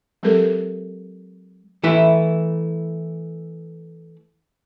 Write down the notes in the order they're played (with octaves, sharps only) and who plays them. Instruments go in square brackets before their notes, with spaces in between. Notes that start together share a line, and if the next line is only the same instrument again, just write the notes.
[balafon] F#3 G#3 C4 G4 A4 A#4
[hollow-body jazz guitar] E3 A3 E4 B4